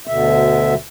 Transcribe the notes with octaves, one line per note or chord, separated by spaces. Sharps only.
D2 B2 D3 E5